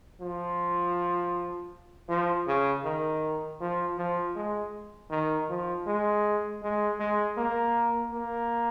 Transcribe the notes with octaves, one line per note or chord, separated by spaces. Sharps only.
F3
F3
C#3
D#3
F3
F3
G#3
D#3
F3
G#3
G#3
G#3
A#3
A#3